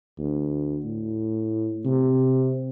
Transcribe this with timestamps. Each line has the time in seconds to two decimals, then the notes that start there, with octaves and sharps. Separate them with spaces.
0.18 D2
0.85 A2
1.85 C3